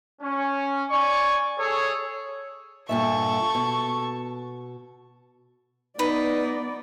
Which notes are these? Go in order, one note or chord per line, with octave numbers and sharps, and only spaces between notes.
C#4
D5 G#5 C#6
G#4 A4 C#5
G2 A#2 A4 E5 C#6
B2
B3 D#4 B4 D5